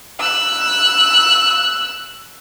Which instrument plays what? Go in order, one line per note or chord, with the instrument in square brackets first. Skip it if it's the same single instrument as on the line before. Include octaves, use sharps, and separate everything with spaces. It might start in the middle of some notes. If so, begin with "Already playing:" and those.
[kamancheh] E6 F#6